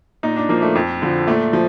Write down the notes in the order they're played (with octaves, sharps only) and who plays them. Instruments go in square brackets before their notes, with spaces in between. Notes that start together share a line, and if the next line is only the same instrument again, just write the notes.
[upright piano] A#2 D#4
D4
F3 A#3
A3
F2
D3 F3
A#2 A3
F3